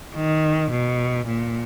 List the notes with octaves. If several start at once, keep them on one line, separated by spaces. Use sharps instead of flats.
D#3
B2
A#2